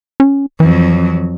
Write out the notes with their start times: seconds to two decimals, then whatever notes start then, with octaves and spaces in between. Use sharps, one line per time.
0.20 C#4
0.60 F2 E3 F#3